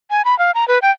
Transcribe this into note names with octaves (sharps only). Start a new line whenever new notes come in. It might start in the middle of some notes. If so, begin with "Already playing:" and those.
G#5
B5
F5
A#5
B4
G5